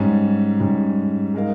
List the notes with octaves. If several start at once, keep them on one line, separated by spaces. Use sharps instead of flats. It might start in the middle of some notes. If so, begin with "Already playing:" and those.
Already playing: G#2 G3 C#4
G#2 G3 C#4
G#3 D#4 A#4 F5